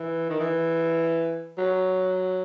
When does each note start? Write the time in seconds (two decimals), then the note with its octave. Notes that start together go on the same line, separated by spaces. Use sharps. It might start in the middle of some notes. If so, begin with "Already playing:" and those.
Already playing: E3
0.29 D#3
0.40 E3
1.58 F#3